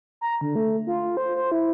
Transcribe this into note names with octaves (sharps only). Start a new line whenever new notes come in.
A#5
D3
A3
F4
C5
C5
E4